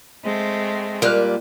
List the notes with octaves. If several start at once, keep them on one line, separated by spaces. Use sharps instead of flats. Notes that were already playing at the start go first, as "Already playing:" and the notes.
G#3 A3 C4
A#2 G3 A#4 F6 F#6